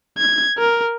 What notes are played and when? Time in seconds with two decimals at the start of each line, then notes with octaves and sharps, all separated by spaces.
0.18 G#6
0.58 A#4